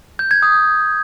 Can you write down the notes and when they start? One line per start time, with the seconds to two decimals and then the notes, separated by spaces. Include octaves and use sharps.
0.19 G6
0.31 G#6
0.42 D#6